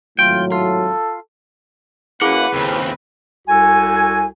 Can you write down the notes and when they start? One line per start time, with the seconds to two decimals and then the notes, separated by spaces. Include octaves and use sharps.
0.19 G#1 A2 F#3 F4 G5
0.52 F4 A4
2.22 F#2 A#3 E4 G#4 B4 F#5 D6
2.54 D#2 C#3 C4
3.48 C2 F#4 A4 G#5